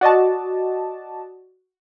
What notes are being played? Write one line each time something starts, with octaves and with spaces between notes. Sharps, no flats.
F#4 D5 D#5 A5